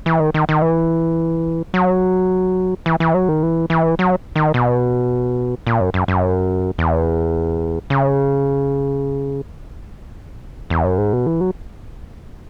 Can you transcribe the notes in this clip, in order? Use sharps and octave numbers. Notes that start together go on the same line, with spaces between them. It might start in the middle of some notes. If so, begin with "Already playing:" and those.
E3
D#3
D#3
D#3
E3
F#3
E3
E3
F#3
D#3
E3
E3
F#3
D#3
B2
A#2
F#2
F#2
F#2
E2
C#3
E2
F#2
G#2
B2
E3
F#3